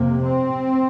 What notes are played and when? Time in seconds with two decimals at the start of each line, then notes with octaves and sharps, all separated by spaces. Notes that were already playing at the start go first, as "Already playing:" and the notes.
Already playing: F2 C3 A#3
0.24 C4